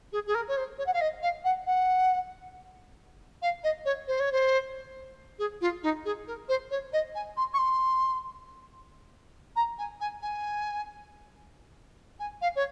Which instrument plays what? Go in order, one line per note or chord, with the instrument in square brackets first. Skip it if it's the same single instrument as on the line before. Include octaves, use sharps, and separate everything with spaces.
[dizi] G#4
G#4
A#4
C#5
C5
C#5
F#5
F5
D#5
F5
F#5
F#5
F5
D#5
C#5
C5
C#5
C5
G#4
F4
D#4
G#4
A#4
C5
C#5
D#5
G#5
C6
C#6
C6
A#5
G#5
G#5
G#5
G#5
F5
C#5